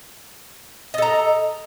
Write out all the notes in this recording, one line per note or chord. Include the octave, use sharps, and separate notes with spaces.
A4 D#5 A#5